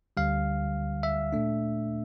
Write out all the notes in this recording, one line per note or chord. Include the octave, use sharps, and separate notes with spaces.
D2 D3 G3 F5
E5
A#2 A3 D4